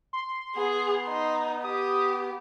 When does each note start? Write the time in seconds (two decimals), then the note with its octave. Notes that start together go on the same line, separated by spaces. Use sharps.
0.13 C6
0.56 B3 G#4
1.09 D#4
1.64 G4 D#6